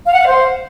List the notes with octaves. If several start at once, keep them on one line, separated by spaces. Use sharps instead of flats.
F5
F#5
F5
C5